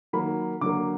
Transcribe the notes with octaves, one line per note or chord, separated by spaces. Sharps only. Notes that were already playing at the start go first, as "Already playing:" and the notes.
D#3 F#3 A#3 B5
D3 F#3 A#3 D6